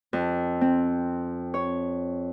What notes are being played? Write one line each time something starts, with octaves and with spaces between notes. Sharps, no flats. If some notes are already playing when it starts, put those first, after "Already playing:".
F2
C4
C#5